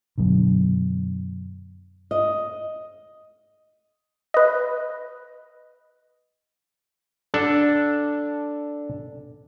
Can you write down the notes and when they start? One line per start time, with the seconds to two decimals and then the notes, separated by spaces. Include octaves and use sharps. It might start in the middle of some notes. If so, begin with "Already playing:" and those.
0.18 F#2 B2 D3
2.11 D#5
4.34 B4 D#5
7.34 D4 A4